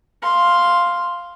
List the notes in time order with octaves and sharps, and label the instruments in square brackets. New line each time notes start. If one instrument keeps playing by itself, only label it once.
[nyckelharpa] F5 C6